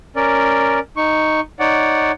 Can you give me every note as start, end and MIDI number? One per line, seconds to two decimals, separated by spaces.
0.16 0.79 61
0.16 0.79 70
0.16 0.79 74
0.97 1.40 63
0.97 1.40 85
1.60 2.12 63
1.60 2.12 73
1.60 2.12 74
1.60 2.12 78